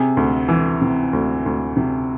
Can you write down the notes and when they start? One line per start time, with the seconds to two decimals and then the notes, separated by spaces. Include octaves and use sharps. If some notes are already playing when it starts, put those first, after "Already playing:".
Already playing: C3 G#4
0.17 D2
0.48 E3
0.82 C3
1.13 D2
1.46 D2
1.77 C3